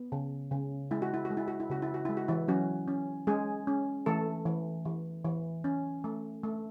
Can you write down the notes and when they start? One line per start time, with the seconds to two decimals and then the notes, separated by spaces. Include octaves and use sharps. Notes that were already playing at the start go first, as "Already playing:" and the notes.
Already playing: B3
0.12 C#3
0.51 C#3
0.91 G#3 E4
1.02 F#4
1.14 E4
1.25 F#4
1.31 G#3
1.37 E4
1.48 F#4
1.60 E4
1.70 C#3 F#4
1.82 E4
1.94 F#4
2.05 G#3 E4
2.17 F#4
2.28 E3 E4
2.48 F#3 C#4 F#4
2.88 C#4
3.27 G#3 C#4 G#4
3.67 C#4
4.06 E3 A3 A4
4.46 E3
4.85 E3
5.25 E3
5.64 C#4
6.04 A3
6.43 A3